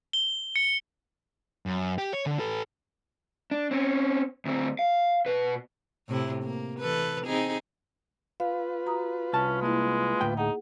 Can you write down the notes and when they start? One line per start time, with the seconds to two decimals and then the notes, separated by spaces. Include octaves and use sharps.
0.13 G7
0.56 C#7
1.66 F#2
1.98 G4
2.13 C#5
2.26 D3
2.39 A4 B4
3.51 D4
3.71 C4 C#4
4.45 D2 C4
4.79 F5
5.26 B2 B4
6.08 A2 C3 E4
6.43 A#3
6.80 E3 A4 B4
7.25 C4 D#4 G#4
8.40 F4 B4 F5
8.86 F#4 A#5 D#6
9.33 C2 C#4 A5
9.62 G#3 A#3 E4
10.21 D2 A2 G5
10.38 D#4 G#4 F#5